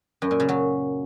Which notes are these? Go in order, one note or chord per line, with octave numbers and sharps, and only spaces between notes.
F#2
A#2
C#3
F#3